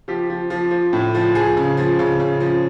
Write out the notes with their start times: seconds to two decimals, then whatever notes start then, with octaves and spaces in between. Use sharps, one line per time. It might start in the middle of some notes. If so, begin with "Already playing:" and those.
0.08 F3 G4
0.30 F3
0.50 F3
0.71 F3
0.93 A2
1.14 F3
1.35 F3 G#4
1.57 C#3
1.77 F3
1.99 C#3
2.20 C#3
2.40 F3